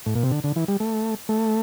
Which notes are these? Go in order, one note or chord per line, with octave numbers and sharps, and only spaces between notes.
A2
A#2
C3
D3
D3
E3
G3
A3
A3